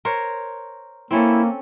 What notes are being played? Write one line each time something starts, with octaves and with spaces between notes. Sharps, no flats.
A#4 C5 C#5
A#3 C4 C#4 E4 A4